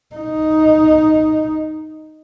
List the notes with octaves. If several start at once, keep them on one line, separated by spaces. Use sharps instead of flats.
D#4